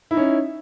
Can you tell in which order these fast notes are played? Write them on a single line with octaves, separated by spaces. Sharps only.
E4 D#4 C#4